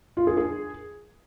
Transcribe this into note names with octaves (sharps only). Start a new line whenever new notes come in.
F4
G#4
G#4